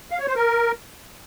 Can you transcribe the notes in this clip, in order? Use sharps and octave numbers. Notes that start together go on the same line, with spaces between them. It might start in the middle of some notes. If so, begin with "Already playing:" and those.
F5
C#5
C5
A#4